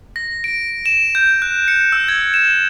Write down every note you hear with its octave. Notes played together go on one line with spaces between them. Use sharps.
A#6
D7
E7
G6
F#6
C#7
E6
G#6
E7